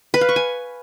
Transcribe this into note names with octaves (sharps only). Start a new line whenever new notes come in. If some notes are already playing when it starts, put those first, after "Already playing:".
B4
F5
C#6
G#5